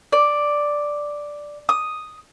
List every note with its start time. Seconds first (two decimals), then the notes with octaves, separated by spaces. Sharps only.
0.12 D5
1.69 D#6